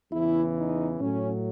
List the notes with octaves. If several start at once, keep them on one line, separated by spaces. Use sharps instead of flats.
E2 C#3 E3 E4
D#4
A2 F#3 C#4